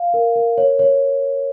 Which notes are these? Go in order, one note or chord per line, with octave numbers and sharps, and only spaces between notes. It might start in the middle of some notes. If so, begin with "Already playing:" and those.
Already playing: F5
A#4
A#4
C#5
C#5